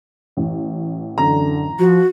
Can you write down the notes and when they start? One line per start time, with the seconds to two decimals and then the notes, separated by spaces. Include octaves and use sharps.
0.37 A1
1.18 F#2 D3 A#5
1.79 F3 F#4